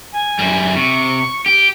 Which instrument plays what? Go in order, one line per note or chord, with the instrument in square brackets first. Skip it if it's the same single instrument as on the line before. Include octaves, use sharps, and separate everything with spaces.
[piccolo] G#5
[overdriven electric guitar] F#2 G3
[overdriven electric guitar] C3 [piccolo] C#6
[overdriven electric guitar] G4 [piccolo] D7